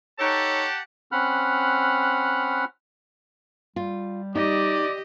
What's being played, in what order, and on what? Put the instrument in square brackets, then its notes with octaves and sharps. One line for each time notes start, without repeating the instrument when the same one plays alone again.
[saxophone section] D#4 A4 C#5 [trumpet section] G4 F#5 A5
[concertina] C4 C#4 F#5 B5 F6 F#6
[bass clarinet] G3 [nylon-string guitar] F4
[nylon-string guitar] D#4 [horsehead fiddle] G4 D#5 [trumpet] D5